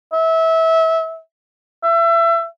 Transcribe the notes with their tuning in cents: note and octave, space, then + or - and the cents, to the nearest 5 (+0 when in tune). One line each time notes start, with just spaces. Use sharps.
E5 -25
E5 +30